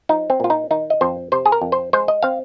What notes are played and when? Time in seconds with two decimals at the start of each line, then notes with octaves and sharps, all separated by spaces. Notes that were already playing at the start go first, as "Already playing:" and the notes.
0.09 F3 D#4
0.30 C4
0.40 A#2 F4
0.50 D#4
0.70 D#3 D#4
0.90 D#5
1.01 F2 C5
1.32 C3 C5
1.46 G#4
1.52 A#4
1.62 F2
1.72 C5
1.93 G#3 C5
2.08 D#5
2.23 C4 F5